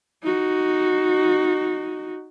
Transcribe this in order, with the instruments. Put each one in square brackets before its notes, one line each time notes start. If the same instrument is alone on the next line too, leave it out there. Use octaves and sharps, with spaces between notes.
[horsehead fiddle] D#4 F#4